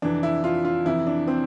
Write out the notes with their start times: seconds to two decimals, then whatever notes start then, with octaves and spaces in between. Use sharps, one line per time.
0.02 F2 C3 E3 D4
0.23 E4
0.44 F4
0.65 F4
0.86 F2 C3 E3 E4
1.07 D4
1.27 C4